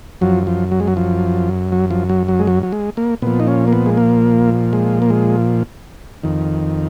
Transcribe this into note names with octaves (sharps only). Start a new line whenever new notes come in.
F#2 F3 F#3
F3
F#3
G#3
F#3
F3
F#3
F3
F#3
F#3
G#3
F#3
F#3
G#3
A#3
A#2 F3 B3
D#4
C#4
A#3
B3
G#3
A#3
G#3
A#3
G#3
F2 D#3